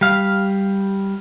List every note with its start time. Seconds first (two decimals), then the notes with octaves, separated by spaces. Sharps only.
0.01 G3 F5